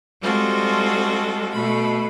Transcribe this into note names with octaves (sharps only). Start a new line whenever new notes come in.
G3 G#3 C4 F4 F#4 A4
B2 A3 B5